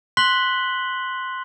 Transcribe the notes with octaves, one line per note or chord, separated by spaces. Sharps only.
C6 F#6 B6 F#7 G7